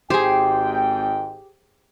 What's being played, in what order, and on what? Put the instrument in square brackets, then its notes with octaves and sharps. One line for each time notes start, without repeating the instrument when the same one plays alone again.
[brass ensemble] G#1 G#2 G5 [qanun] G4 [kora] G#4 C5